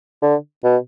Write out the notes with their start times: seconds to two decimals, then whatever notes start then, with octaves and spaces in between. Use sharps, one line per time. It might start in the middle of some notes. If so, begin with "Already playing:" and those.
0.22 D3
0.64 B2